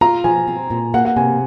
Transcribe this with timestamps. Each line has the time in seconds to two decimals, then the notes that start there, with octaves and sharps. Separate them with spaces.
0.01 F4 A#5
0.24 F3 G#5
0.48 C4
0.70 A#2
0.94 A#3 F#5
1.05 F#5
1.16 C3 G#5